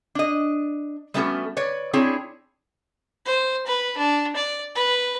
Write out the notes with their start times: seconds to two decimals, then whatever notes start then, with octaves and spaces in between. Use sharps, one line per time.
0.15 D4 D#5
1.14 G3 A3 B3 C#4 F#4 A4
1.57 B4 C#5 D5
1.93 C4 D4 E4 G#4 C#5
3.26 C5
3.66 B4
3.98 D4
4.36 D5
4.75 B4